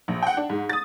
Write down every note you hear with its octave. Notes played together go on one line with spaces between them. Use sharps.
A#1
F#5 G5
D4
G#2
D#6 A6